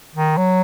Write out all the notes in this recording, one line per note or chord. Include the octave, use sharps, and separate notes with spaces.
D#3
F#3